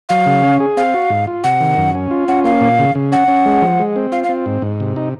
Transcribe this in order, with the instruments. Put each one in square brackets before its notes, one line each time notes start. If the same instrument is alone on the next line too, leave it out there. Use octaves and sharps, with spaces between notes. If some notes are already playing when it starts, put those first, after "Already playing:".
[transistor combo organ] F#3 [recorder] F5
[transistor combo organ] C#3
C#4
G#4
[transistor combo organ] C4 [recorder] F5
[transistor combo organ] F#4
G#2
F4
[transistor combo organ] C3 [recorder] F#5
[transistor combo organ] D#3
F#2
C#4
F4
[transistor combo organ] C#4 [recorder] F#5
[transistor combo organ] A#3 [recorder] F5
[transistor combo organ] A#2
C#3
C#3
[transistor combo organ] C#4 [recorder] F#5
[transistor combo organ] C#4
G#3
F3
G#3
C4
[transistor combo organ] F4 [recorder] F5
[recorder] F5
[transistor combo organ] C4
G#2
G#2
C3
D#4